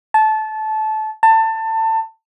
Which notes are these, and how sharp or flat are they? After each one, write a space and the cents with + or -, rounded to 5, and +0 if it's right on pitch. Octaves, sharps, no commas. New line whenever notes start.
A5 -20
A5 +25